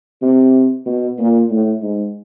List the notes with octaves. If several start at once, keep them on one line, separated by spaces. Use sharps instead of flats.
C3
B2
A#2
A2
G#2